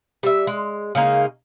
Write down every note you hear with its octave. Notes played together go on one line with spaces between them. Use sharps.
G3 E5
G#3
C#3 G#3 A#3 D#4